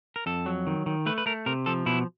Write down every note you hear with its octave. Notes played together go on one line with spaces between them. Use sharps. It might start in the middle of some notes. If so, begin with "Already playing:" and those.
A#4
F2 A4
F#3
D#3
D#3
A3 B4
B4
A3 A#4
C3 A#4
F3 A4
B2 E4